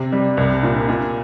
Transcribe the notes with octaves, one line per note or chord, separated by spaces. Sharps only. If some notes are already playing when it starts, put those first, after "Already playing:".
Already playing: C3
G3
C2
A#2
A#2